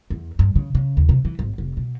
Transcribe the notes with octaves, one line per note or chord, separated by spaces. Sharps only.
E2
G2
C#3
C#3
D#2
C3
E3
G#1
F1
B2